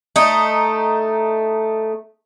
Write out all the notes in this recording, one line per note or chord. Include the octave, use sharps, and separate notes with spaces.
A3 D#4